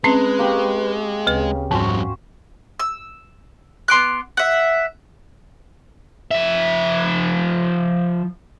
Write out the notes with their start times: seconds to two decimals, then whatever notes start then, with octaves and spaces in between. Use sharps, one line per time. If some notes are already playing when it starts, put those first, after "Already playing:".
0.04 G#3 C4 C#4 B4 C6
0.39 A#3 G4 C#6
1.27 D2 C#3 B4
1.71 F2 G#2 G3 C#4 F#4 C5
2.79 E6
3.88 B3 C6 D6 F#6
4.37 E5 F#5
6.31 F3 E5